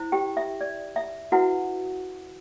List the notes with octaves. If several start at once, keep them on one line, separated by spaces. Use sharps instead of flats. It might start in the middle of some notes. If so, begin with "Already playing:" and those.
Already playing: E4 C5
G4 G5
E5
D5
E5
E4 F#4 B4 F#5